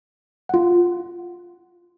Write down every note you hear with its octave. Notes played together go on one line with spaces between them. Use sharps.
F4 F#5